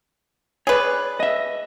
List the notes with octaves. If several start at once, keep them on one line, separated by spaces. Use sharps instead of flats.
G#4 B4 C#5 D5
D#5 E5